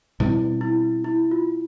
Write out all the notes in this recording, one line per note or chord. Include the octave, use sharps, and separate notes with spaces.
B2 G3 C4 E4
E4
E4
F4